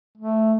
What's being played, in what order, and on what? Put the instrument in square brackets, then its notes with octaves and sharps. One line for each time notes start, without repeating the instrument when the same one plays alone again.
[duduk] A3